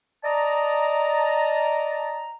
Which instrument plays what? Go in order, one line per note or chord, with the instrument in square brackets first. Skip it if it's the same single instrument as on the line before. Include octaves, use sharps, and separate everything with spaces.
[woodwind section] D5 D#5 A5 A#5